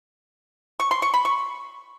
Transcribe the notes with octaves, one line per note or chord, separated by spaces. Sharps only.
C#6
C6
C#6
B5
C#6